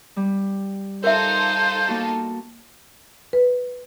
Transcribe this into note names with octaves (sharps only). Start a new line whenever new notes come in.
G3
D#4 F4 A4 A#4 C5 E5
A#3 F#4 A5
B4